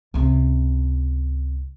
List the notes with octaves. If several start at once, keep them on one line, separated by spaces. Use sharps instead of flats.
C#2 C3